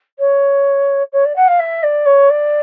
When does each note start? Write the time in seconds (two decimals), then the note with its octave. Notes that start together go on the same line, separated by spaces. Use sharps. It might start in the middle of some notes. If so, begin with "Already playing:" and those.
0.19 C#5
1.12 C#5
1.25 D5
1.36 F#5
1.48 F5
1.59 E5
1.83 D5
2.06 C#5
2.30 D5